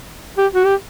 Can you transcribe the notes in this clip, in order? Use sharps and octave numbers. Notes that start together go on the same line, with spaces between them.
G4
F#4
G4